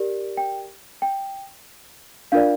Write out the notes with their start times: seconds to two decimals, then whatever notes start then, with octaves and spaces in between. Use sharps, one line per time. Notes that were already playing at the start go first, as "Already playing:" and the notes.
Already playing: G4 A#4 D5
0.37 G5
1.02 G5
2.32 D4 F4 A#4 D5 F5